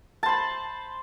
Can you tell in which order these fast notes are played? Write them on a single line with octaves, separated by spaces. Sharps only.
A5 C5 B5